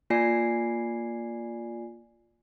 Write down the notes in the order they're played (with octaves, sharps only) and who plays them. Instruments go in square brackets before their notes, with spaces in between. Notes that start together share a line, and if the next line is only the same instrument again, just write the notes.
[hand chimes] A#3 F4 D5 G#5 C7